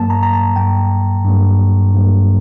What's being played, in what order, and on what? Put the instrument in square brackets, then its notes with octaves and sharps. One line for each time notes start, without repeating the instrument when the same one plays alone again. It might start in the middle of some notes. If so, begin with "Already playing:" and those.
Already playing: [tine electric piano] G2 F#3 A#3 A5
A#5
A#5
A5
G2 F#3 A#3 G5
G2 F#3 A#3
G2 F#3 A#3